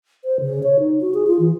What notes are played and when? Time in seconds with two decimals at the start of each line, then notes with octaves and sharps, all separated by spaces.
0.24 C5
0.40 C#3
0.63 C#5
0.79 D#4
1.01 F#4
1.14 G#4
1.27 F4
1.39 E3